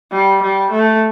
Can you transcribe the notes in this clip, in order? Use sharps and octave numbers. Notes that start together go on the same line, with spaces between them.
G3
G3
A3